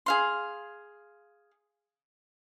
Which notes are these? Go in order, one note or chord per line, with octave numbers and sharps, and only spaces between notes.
G#4 F5 C6